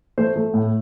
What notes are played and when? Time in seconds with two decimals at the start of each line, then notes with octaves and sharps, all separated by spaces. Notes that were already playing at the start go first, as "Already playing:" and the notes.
0.18 A3 C5
0.36 A3
0.54 A2